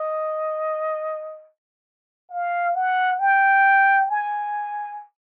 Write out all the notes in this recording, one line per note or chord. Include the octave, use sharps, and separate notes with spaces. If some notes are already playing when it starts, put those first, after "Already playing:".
Already playing: D#5
F5
F#5
G5
G#5